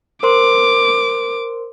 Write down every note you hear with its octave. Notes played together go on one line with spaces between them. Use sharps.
A#4 C5 C6 D6